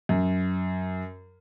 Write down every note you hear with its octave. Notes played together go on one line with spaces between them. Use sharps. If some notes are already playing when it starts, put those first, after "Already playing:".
F#2